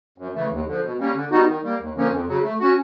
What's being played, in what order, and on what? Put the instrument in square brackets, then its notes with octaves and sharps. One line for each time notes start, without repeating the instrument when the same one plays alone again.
[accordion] F#2
C#3 E3 A3
D#2
D3 F3
B2
G3 A#3 C#4
D3
G3 B3 D#4 F#4
D#3
G3 A#3
D#2
D3 F3 A#3 C#4
F2
C#3 F#3
A3
C#4 F#4